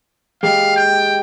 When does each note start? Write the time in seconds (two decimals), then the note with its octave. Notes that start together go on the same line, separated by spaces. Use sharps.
0.43 G#3 G4 F5
0.76 G5